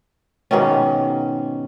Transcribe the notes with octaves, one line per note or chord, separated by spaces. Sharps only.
G#2 B2 D#3 C#4